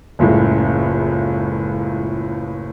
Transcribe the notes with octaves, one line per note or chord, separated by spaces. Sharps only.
F#1 C#2 A2